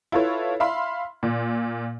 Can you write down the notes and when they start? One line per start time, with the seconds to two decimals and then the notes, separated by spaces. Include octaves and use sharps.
0.12 E4 F4 A4 B4 C#5
0.60 E5 F5 B5 C6
1.23 A#2